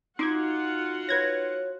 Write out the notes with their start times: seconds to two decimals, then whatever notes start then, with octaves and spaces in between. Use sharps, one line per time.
0.19 D#4 F4 F#4 F#5 C6 D6 G#6
1.09 B4 C#5 G#6 A#6